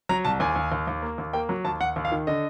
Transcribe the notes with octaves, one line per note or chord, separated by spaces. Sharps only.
F#3 A#5
C2 A5
D#2 G#5
D#2
D#2
D#2
A#3
D#2
A#3 G5
F#3
D#2 A5
D#2 F#5
D#2
F5
D#3
D3 D#5